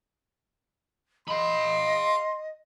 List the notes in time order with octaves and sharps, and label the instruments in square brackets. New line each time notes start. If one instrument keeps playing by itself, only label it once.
[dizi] D#5 [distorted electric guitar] F5 B5 [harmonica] C6